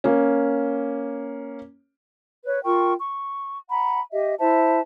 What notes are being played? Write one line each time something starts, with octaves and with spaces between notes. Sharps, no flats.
A#3 C#4
B4 C#5
F4 A#4 G5 C#6
C#6
F#5 A#5 B5
G4 D#5 E5
E4 C5 E5 A5